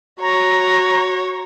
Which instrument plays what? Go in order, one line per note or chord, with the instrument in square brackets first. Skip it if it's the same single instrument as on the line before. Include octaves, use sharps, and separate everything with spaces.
[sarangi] F#4 [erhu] C#5 [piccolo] A#5